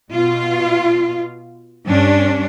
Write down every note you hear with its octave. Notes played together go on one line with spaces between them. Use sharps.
B2 F4
G2 C#4 D4